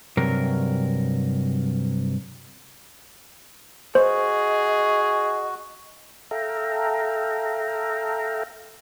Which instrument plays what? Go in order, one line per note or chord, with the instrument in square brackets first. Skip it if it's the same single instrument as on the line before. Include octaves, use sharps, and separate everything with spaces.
[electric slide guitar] G2 C3 F#3 A#4
[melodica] F#4 [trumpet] G#4 [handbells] C5 [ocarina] D#5
[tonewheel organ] A4 E5 F5 G5 A#5